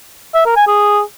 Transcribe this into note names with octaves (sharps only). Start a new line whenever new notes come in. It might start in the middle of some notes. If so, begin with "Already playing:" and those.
E5
A#4
G#5
G#4